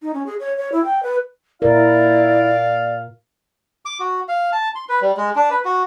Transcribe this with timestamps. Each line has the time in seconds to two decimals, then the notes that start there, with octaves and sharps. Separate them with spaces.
0.02 D#4
0.14 C#4
0.26 G#4
0.40 C#5
0.58 C#5
0.72 E4
0.85 G5
1.03 B4
1.62 A#2 E4 A#4 D5 F5
3.85 D6
4.00 F#4
4.28 F5
4.52 A5
4.75 C6
4.89 B4
5.02 G3
5.17 G#3
5.36 D4
5.50 B4
5.65 F#4